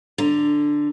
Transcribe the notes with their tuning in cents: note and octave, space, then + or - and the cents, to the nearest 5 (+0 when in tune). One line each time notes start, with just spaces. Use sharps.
D3 +5 A#5 +0